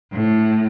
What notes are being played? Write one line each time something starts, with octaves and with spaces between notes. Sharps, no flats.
A2